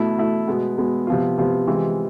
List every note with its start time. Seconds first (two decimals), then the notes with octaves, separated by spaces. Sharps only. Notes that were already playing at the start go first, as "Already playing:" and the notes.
Already playing: B2 A3 E4
0.16 B2 A3 E4
0.48 B2 G#3 B3
0.77 B2 G#3 B3
1.07 C3 F3 B3 F4
1.38 C3 F3 B3 F4
1.67 C3 E3 G#3 C4 F4